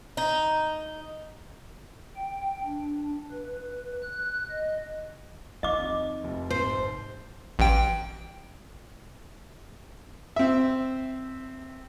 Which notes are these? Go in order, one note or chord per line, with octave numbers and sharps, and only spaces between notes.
D#4
G5
D4
B4
F#6
D#5
D#3 D#5 D6
F2 D#4
F1 F2
G#1 C5
A1 G5
C4 E5